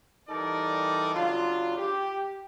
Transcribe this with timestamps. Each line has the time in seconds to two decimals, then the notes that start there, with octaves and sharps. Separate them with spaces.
0.29 E3 G3 D#4 A4 A#4 D5
1.15 C#3 F#3 D4 F4
1.77 G4